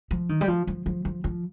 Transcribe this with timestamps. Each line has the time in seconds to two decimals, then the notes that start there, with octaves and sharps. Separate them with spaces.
0.11 F3
0.29 D#3
0.41 G3
0.48 F3
0.67 F3
0.86 F3
1.05 F3
1.24 F3